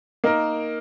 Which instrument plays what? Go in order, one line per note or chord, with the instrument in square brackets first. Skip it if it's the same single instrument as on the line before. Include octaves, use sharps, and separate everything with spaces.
[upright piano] A#3 D#4 A#4